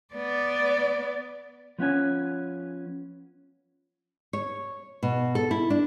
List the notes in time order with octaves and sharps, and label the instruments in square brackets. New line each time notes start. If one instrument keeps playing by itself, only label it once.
[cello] B3 D5
[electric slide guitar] F3 B3 C#4 G#5
[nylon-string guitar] C#5
B2
A4
E4
D4